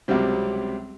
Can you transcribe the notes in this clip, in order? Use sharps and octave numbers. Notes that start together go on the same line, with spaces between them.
C#2 C3 F#3 G3 C4